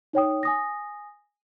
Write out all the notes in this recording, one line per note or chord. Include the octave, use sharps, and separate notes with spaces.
D#4 C#5 G5 D#6
G#5 D#6 A#6